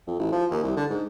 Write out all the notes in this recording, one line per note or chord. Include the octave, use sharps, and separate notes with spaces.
F2
A1
F3
D#2
C2
D3
G#2